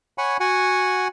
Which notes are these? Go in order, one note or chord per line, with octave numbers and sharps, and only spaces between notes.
C#5 F#5 G#5 B5 C#6
F#4 F#5 G#5